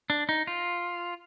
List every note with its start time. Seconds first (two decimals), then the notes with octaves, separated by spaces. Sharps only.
0.10 D4
0.29 D#4
0.47 F4